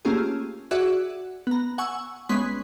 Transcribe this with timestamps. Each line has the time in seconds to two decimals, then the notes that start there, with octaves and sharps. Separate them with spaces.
0.05 A3 A#3 C#4 F4 G4 G#4
0.71 F#4 G#4 D5 E5 F#5
1.47 B3 A#5
1.78 F#5 G#5 C#6 E6
2.29 G1 G#3 B3 C#4 C6 B6